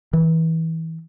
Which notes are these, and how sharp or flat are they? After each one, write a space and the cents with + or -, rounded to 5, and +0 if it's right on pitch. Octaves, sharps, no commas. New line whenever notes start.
E3 -25